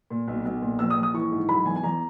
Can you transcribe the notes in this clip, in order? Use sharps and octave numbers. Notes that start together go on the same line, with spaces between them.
A#2
B1
B1
A#2
A#1 E6
D#6
A#1
D#6
E3 C#6
G#2
F#3 B5
E2 G#5
G#5
E2 A#5